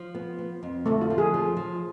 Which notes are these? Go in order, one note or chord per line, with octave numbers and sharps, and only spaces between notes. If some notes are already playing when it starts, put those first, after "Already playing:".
Already playing: F3
B3
B3
F2
D3 A3
F4
F3
G#4
F3
F3